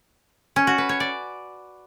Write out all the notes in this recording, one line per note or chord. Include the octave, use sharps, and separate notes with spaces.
C#4
F#4
B4
C#5
D5